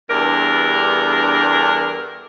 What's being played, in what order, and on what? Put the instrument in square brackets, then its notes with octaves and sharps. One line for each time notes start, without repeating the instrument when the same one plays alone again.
[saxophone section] E2 G2 D4 A4 A#4